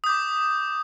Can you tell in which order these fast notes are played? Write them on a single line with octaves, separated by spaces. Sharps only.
D#6 G6 D6